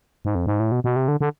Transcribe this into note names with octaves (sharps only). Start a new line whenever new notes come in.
G#2
F2
G#2
A2
B2
B2
C3
D3
D3